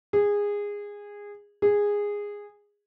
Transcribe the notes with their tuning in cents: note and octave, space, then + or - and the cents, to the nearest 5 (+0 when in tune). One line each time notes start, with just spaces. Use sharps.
G#4 -15
G#4 -10